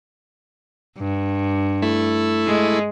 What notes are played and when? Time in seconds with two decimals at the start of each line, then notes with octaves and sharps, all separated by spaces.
0.99 G2
1.82 A3 E4
2.47 G#3